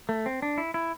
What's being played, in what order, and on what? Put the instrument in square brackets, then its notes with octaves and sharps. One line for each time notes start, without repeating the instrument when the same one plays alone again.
[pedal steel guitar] A3
C4
D4
E4
E4